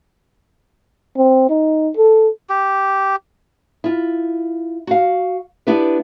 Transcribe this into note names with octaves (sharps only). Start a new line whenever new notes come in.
C4
D#4
A4
G4
E4 F4
F#4 F5
B3 D4 E4 G4 B4